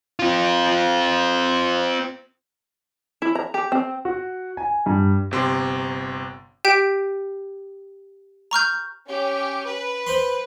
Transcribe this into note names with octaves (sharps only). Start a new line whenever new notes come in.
C4 F4
E4
A#5
G4
C4
F#4
G#5
G2
G1 C3 C6
G4 G5 G6 B6 D7
A#5 C#6 F6 G6
C#4 G4
B4
C5 B5 C6